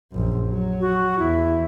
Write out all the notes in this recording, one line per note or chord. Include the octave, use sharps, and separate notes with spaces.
A#1 F#2
F#3
F#4
E2 E4